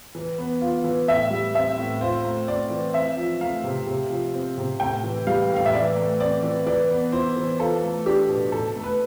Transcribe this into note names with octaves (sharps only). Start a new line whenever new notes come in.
E3
B3
F4
E3
A2 E5
G3
C4 E5
A2
F4 C5
A3
C4 D5
E3
C4 E5
F3
A3 F5
C3
C3
F3
C4
C3
A2 G5
E3
G3 F5
A2
F5
E5
E3 D5
A3
C4 D5
E3
E3 D5
B3
E4 C5
E3
F4 A4
A3
D4 G4
B2
B2 A4
A3
B4